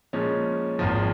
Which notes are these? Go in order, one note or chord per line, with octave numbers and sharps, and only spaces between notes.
A#2 F3 G#3 C#4
G#1 G#2 F3